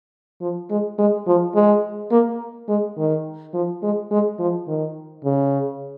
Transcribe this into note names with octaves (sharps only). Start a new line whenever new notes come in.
F3
G#3
G#3
F3
G#3
A#3
G#3
D#3
F3
G#3
G#3
F3
D#3
C#3